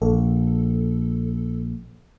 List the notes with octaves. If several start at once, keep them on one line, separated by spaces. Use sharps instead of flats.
A#1 A4